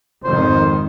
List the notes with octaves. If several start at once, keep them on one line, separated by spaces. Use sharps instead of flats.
G#1 F2 D#3 C5